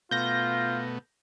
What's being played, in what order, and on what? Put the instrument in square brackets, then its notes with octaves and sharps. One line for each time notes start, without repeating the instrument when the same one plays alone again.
[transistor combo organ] B2 A3 B3 [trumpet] F4 [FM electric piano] G6 A#6